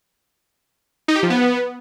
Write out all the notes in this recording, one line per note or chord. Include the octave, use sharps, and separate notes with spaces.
D#4
G4
F3
B3